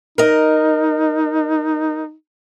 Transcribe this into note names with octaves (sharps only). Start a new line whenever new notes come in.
D#4 A#4 D#5